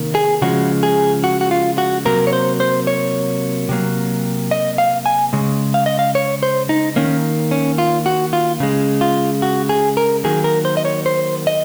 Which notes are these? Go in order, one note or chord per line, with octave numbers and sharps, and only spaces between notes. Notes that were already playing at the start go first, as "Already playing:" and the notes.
Already playing: C3 D#3 A#3
G#4
C#3 F3 G#3 F#4
G#4
F#4
F#4
F4
F#4
C3 F#3 A#3 A#4
C#5
C5
C5
C#5
C3 F#3 A#3
D#5
F5
G#5
C#3 G#3
F5
D#5
F5
C#5
C5
D#4
D#3 A#3 C#4
C#4
F4
F#4
F4
C#3 G#3
F4
F#4
G#4
A#4
D#3 F#3 A#3 G#4
A#4
C5
D#5
C#5
C5
D#5